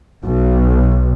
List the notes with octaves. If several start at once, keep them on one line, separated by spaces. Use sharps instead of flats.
B1